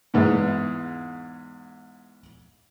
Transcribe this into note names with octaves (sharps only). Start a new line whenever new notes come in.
E2 G#2 B3 E4 G#4